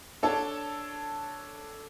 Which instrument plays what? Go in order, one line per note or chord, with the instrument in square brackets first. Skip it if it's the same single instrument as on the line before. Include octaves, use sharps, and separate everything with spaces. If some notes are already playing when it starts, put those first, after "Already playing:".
[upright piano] D4 A4 C#5 A5